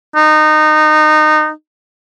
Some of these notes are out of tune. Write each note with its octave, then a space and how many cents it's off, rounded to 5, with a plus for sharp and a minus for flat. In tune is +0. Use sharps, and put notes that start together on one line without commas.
D#4 -20